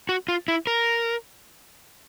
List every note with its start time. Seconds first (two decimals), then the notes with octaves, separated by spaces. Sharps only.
0.09 F#4
0.28 F4
0.48 E4
0.67 A#4